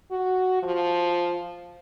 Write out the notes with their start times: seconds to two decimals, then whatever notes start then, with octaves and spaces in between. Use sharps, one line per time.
0.11 F#4
0.62 F3